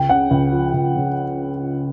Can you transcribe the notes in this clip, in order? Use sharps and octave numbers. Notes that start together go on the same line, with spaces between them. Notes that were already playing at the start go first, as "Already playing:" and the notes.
Already playing: C#2 G5
C#3 F#5
C#2
F3
C#2
C#3